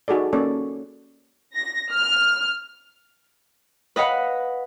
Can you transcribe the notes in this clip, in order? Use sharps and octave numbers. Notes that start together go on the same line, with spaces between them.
D#4 F#4 G#4 A4 D5
A#3 C#4 A4 C#5 D5
A#6
F6
B4 D#5 F5 F#5 B5